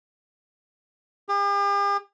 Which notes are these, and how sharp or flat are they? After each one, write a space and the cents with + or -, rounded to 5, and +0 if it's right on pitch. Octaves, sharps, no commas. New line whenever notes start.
G4 +45